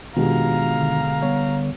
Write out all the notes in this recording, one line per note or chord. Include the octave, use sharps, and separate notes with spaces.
B2 D#3 G#3 D4 F4 G4 F5 A#5
D3
G3 B3 C#5